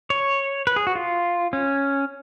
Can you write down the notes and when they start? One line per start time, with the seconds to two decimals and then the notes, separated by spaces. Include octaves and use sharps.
0.10 C#5
0.67 B4
0.76 G#4
0.87 F#4
0.95 F4
1.53 C#4